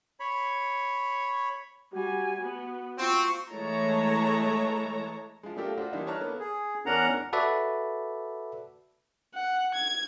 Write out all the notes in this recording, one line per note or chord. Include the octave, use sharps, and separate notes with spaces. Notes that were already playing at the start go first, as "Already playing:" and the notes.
C#5 B5
G3 F#4 G#5
B3 F#4
C4 F4 C#6
E3 G#3 A3 C#5 A5 A#5
F3 G#3
A3 D4 F4 G4 A4 A#4
D4 F4 F#4 C5
D3 E3 G3 A#3 D4 D#4
C#5 A5 A#5 F6 F#6
A#3 B3 A4
G#4
E2 C#4 D4 A#4 F#5 A#5
F#4 A4 B4 D5 E5
F#5
G#6